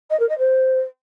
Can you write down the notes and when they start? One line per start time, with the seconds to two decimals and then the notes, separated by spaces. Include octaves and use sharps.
0.10 D#5
0.20 A#4
0.29 D#5
0.38 C5